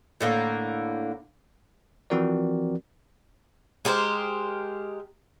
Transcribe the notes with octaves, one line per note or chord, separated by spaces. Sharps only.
A2 D3 A#3
E3 F3 C4 F#4 A#4 D5
G#3 G4 A#4 C5